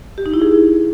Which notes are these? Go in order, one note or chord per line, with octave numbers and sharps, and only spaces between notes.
G4
D#4
E4
G#4